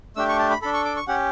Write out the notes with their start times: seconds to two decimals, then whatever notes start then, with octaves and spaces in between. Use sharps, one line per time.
0.16 A3 D4 G4 E6
0.29 C#6
0.39 A5
0.50 B5
0.62 A4 B5
0.65 D4
0.74 C#6
0.85 D6
0.96 C#6
1.08 C#4 G4 F#5